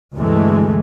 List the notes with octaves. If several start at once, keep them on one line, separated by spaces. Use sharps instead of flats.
D2 G2 C3 E3 G#3 A3